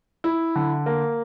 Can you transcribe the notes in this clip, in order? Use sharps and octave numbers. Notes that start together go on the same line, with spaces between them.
E4
D3
A#3